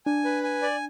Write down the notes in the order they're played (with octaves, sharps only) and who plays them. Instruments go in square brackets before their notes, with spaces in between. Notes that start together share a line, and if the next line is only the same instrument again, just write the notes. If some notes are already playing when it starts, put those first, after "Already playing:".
[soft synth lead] D4 [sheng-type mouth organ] G#5
[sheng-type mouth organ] B4
G#5
D5